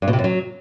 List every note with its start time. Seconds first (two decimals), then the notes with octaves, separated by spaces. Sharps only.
0.02 G2
0.08 B2
0.13 C3
0.19 F#2
0.24 F#3